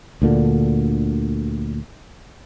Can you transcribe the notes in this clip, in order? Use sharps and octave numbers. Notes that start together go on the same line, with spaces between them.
D2 A#2 D3